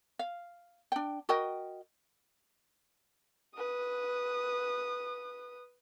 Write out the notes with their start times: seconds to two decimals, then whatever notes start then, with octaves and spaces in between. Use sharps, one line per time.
0.19 F5
0.92 D4 G5
1.29 F#4 A#4 D#5 G5
3.56 B4 D#6